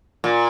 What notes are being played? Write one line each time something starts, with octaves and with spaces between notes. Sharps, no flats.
A#2